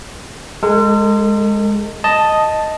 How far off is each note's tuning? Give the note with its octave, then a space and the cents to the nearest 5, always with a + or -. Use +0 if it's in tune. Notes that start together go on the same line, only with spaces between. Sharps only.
G#3 +0 A4 +45
D#5 +0 A5 +0